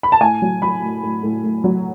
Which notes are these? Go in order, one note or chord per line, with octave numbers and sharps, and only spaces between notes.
B5
A5
A2 G#5
F#3
F#3 B5
A2
A2
A2
A2
F#3